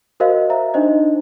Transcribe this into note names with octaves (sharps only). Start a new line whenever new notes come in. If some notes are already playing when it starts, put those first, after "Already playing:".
F#4 A#4 C5 D#5 F5
E5 A#5
D4 D#4 C5 D#5